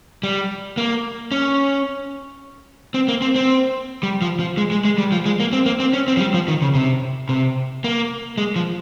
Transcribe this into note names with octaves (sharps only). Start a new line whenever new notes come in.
G3
A#3
C#4
C4
A#3
C4
C4
G3
F3
F3
G#3
G#3
G#3
G3
F3
G#3
A#3
C4
A#3
C4
C#4
C4
F3
G3
F3
D#3
C#3
C3
C3
A#3
G#3
F3